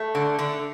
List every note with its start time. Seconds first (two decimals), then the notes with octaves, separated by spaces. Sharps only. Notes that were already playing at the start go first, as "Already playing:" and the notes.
Already playing: A3
0.15 D3
0.39 D3